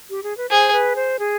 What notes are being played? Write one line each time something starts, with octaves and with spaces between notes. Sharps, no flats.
G4
G#4
B4
G#4 C5
B4
C5
G#4